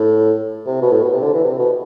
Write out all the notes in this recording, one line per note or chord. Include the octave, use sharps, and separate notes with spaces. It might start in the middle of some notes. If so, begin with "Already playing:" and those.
Already playing: A2
C3
B2
A2
B2
C3
D3
E3
C3
B2